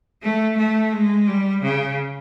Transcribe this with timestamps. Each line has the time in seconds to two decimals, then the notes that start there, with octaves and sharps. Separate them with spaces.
0.22 A3
0.57 A3
0.92 G#3
1.27 G3
1.63 C#3